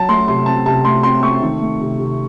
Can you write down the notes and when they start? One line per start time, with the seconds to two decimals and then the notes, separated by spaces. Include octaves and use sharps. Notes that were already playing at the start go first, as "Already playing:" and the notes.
Already playing: F#3 A5
0.09 A3 C6
0.27 C3 C6
0.46 C4 A5
0.66 C3 A5
0.85 A3 C6
1.03 C4 C6
1.22 A3 C#6
1.42 D#3
1.61 A3
1.81 C3
1.99 C3